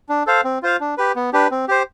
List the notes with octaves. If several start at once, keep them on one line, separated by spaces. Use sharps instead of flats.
D4
A4 C5 F5
C4
F4 C5 F5
D4
G4 B4
B3
D4 G4 B4
C4
G4 C5